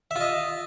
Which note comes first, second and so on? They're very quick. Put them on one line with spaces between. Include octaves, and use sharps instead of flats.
E5 F4 D#5